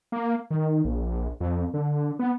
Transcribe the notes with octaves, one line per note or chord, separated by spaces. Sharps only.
A#3
D#3
A#1
F2
D3
B3